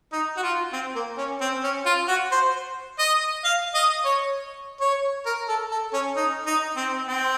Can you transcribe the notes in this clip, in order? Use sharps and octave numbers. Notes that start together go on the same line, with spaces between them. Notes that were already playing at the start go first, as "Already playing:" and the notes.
D#4
F#4
F4
C4
A#3
C#4
C4
C#4
F4
F#4
C5
D#5
F5
D#5
C#5
C#5
A#4
A4
A4
C#4
D#4
D#4
C4
C4